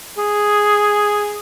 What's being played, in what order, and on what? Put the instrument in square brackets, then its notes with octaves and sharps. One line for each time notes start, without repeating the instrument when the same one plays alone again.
[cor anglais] G#4